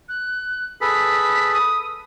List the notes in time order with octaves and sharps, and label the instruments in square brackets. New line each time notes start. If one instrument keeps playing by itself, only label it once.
[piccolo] F#6
[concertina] G#4 A4 B4 [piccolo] B6
[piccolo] D#6